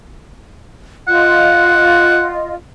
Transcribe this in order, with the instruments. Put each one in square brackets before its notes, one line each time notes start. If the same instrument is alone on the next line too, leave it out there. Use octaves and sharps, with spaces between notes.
[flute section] F4 D#5 [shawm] F#5